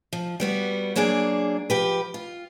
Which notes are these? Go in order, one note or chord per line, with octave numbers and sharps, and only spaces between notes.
F3
G3 B3 F#4
F#3 A#3 D4 G#4 D5
F3 G4 B4
F4